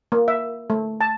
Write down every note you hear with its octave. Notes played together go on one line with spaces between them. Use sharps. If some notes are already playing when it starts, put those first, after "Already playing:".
A#3
E5
A3
A5